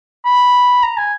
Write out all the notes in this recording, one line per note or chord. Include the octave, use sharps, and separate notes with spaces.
B5
A#5
G#5